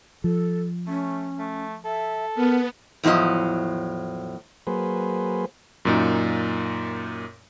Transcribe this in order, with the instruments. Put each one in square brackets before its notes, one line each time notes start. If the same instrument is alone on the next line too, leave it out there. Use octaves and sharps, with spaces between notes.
[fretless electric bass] F3 [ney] A4
[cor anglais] A3 [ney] C#4
[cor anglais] A3
[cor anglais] A4 [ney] E5
[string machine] B3 [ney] A#4
[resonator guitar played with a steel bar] E2 A2 F3 F#3 D#5
[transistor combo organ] F#3 A#3 G#4 B4 C5
[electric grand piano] F#2 A#2 D#4